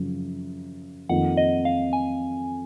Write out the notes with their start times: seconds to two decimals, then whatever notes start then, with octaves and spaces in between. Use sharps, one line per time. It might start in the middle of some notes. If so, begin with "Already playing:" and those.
Already playing: F#2 C#3 F3
1.09 F2 D#3 A#3 F4 F#5
1.37 D#5
1.65 F5
1.93 G#5